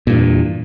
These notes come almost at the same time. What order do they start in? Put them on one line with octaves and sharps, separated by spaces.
A#2 G2 E2